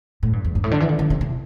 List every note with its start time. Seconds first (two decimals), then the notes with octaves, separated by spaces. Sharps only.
0.23 A2
0.33 G2
0.45 E2
0.55 G2
0.64 A2
0.71 D3
0.80 E3
0.89 D3
0.99 D3
1.10 C3
1.21 C3